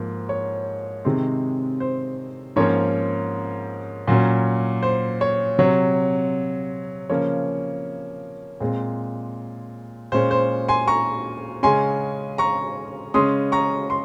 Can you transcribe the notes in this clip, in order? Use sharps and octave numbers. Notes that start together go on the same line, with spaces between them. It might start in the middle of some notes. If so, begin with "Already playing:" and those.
Already playing: G#2 F3 A#3
C#5
C3 D#3 G#3 C4
C5
G#2 F3 A#3 C#4 C#5
A#2 F#3 C#4
C5
C#5
C3 F#3 C4 C#5
C#3 F3 A#3 C#4 C#5
A#2 G#3 C4
A#2 G#3 C#4 C5
C5
G#5 C6
A#5 C#6
C#3 G#3 C#4 G#5 C6
A#5 C#6
C#3 G#3 C#4 C6 D#6
A#5 C#6
C6